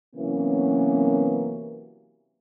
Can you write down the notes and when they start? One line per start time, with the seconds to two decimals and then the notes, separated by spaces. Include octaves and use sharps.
0.16 C3 E3 F#3 A#3 B3 C#4